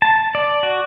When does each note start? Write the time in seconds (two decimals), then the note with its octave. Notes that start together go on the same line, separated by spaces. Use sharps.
0.02 A5
0.35 D5
0.63 F#4